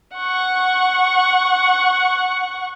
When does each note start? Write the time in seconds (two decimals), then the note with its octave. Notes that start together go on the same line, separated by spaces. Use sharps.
0.15 F#5 C#6